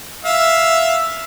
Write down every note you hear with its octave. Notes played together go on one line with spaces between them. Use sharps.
E5 F5